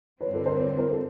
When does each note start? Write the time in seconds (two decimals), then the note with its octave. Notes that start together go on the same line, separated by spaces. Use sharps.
0.21 G2 D3 G3 C4 B4 C#5
0.33 A4 B4
0.46 A#4 C5
0.59 B4 C#5
0.78 A#4 C5
0.91 A4